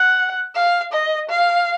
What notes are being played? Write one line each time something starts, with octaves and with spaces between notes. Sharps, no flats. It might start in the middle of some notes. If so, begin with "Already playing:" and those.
Already playing: F#5
F5
D#5
F5